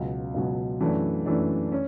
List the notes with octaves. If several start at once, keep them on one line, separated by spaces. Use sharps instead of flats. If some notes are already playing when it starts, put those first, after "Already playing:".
Already playing: C#2 B2 F#3
C#2 B2 F#3
F#2 E3 A3 D4
F#2 E3 A3 D4
C#4